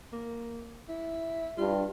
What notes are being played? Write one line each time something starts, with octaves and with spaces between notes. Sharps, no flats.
A#3
E4
G2 F4